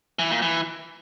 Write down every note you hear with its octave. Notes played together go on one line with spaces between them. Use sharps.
E3
A#2
E3